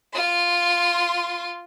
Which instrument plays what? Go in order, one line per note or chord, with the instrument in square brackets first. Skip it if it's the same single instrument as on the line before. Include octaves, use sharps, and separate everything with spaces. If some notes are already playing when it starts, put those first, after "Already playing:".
[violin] F4 C6